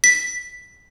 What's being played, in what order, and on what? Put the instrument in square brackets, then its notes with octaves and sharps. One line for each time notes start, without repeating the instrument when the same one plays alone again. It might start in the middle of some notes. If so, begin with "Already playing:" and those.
[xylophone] B6